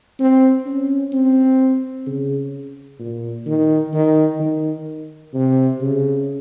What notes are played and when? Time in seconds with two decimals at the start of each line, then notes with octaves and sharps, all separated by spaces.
0.19 C4
0.66 C#4
1.13 C4
2.07 C#3
2.99 A#2
3.46 D#3
3.94 D#3
4.40 D#3
5.34 C3
5.81 C#3